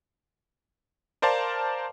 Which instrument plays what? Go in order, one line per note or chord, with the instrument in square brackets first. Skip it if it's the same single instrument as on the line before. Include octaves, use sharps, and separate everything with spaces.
[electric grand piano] A#4 C5 D5 F5 A5